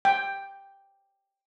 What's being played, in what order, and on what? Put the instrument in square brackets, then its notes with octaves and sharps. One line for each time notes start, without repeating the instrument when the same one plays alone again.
[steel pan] G5